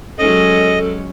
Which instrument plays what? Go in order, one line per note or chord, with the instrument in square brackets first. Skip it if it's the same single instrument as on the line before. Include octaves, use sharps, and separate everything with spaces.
[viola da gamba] F#3 G#3 C#4 [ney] A4 [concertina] D#5